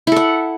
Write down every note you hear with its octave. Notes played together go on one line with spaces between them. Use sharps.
E4 A4 F#5